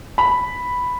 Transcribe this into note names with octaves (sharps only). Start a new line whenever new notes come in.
B5